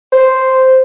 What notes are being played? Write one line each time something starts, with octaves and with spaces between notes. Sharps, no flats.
C5